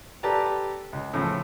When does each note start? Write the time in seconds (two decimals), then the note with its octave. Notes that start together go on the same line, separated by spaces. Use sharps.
0.23 G4 A4 B4 D5 A5 A#5
0.93 C#2
1.14 A2 C#3 E3 F3